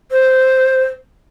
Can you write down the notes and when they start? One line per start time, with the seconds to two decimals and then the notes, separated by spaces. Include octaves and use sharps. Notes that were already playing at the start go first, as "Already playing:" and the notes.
0.11 C5